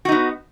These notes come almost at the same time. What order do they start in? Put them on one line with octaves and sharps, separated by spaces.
F#4 D#4 B3